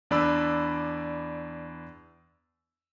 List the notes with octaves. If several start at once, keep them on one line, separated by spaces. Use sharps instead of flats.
E2 D4 D5 B5 E6